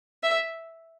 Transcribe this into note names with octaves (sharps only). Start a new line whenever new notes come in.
E5